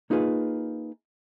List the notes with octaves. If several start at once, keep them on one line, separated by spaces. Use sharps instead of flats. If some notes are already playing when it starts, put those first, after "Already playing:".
A#3 D#4 F4 G#4 B4